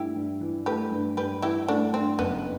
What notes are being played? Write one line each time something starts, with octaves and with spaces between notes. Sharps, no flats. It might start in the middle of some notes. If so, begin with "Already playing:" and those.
Already playing: G2 A3 E4 G4
G2
E3
A3 G4 B4
G2
G2 G4 B4
E3 E4 G4
A3 D4 F#4
G2 C4
F#1 B3